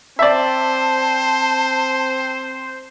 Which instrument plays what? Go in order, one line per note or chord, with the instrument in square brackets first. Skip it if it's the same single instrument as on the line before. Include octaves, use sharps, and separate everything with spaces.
[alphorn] C4 [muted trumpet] C5 [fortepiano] D5 E5 [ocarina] A5